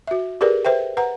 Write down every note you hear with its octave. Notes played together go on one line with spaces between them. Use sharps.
F#4 E5
G4 G#4 A#4 B4 D5
B4 C5 E5 G5
B4 F#5 A#5